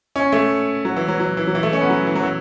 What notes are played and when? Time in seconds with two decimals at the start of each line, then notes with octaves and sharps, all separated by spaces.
0.16 C#4
0.32 A3
0.85 F#3
0.96 E3
1.08 F#3
1.20 F#3
1.37 E3
1.47 F#3
1.55 E3
1.63 A3
1.73 C#4
1.81 B3
1.90 F#3
2.07 E3
2.15 F#3
2.22 E3